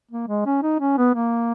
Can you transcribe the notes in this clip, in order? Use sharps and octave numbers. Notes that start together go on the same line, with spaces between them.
A#3
G#3
C#4
D#4
C#4
B3
A#3